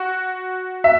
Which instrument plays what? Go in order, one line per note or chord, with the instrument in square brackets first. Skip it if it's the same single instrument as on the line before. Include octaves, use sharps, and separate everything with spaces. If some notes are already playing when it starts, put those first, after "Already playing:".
Already playing: [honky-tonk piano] F#4
E5